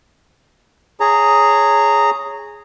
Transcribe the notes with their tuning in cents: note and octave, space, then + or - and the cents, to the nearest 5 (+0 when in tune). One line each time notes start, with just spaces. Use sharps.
G#4 +0 C#5 +0 A#5 -15